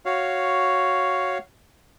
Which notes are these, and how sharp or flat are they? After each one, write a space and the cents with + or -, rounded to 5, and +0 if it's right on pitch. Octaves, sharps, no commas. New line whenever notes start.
F#4 +0 C#5 +0 F5 -5